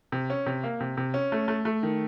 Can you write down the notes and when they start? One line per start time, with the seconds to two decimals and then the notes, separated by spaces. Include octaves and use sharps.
0.12 C3
0.30 C#4
0.46 C3
0.63 A#3
0.80 C3
0.97 C3
1.14 C#4
1.32 A3
1.48 A3
1.65 A3
1.83 D#3